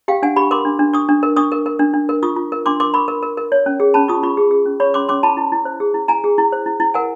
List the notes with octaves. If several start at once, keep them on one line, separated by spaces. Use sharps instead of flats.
G4 F5 G5
D4 F#5 G#5
G4 B5 C#6
A#4 C6 D6
D4
D4
D4 C#6 D#6
D4
A#4
D4 C#6 D#6
A#4
A#4
D4
D4
A#4
F4 C#6 D#6
F4
A#4
D4 C6 D6
A#4 C6 D6
A#4 B5 C#6
A#4
A#4
A#4
C#5
C#4
G#4
C#4 A5 B5
F4 C#6 D#6
F4 B5 C#6
G#4
G#4
C#4
C#5 B5 C#6
C#4 C6 D6
C#4 C6 D6
E4 A5 B5
E4
E4
C5
G#4
E4
E4 G#5 A#5
G#4
E4
C5
E4
E4
A#4 F#5 G#5